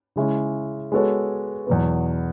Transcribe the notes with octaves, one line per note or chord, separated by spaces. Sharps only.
C#3 G#3 C#4 E4
G#3 B3 F#4 A4 C#5
E2 B2 F#3 B3